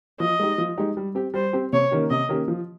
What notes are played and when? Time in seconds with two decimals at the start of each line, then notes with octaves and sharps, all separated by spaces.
0.20 F3 D#5
0.39 G#3 D#4 G4
0.58 F3
0.78 G#3 D#4 G4
0.97 G3
1.15 C4 G4
1.34 G3 C5
1.53 C4 G4
1.73 C3 C#5
1.91 D#3 A#3 C#4 G4
2.10 C3 D#5
2.29 D#3 A#3 C#4 G4
2.48 F3